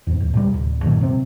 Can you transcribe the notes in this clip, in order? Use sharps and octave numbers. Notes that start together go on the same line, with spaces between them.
E2 G#2
D1
A2 C3 G3
D1
F#2 A#2 D#3 F#3
C3 C4